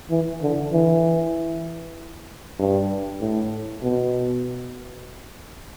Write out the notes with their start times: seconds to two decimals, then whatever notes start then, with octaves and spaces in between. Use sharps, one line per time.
0.10 E3
0.42 D3
0.73 E3
2.59 G2
3.21 A2
3.83 B2